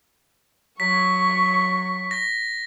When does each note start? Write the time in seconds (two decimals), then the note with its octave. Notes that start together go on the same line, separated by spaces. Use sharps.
0.80 F#3 C#6 B6
2.11 A#6